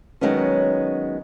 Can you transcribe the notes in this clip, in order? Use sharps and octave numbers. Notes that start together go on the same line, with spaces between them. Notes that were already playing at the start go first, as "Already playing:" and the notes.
D#3 F#3 G#3 B3 C#4